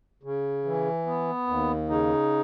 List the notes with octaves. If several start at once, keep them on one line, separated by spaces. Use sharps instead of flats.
C#3
E3
B3
D#2
C#3 D#4